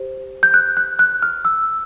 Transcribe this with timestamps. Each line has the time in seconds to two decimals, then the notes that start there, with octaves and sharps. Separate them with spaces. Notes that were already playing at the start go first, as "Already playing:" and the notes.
Already playing: G4 C5
0.43 G6
0.54 F#6
0.77 F#6
0.99 F#6
1.23 F6
1.45 E6